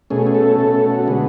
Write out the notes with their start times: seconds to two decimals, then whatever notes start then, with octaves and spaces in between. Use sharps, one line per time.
0.10 B2 A3 C#4 G#4
0.27 G#4
0.35 A4
0.59 B2 A3 C#4 A4
0.75 A4
0.90 F#4
1.07 D3 G#3 B3 F#4